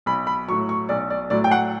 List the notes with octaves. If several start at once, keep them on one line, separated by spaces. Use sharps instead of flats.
B1 B5
B5
A2 F#3 C#6
C#6
B1 D5
D5
A2 F#3 D5
G5
F#5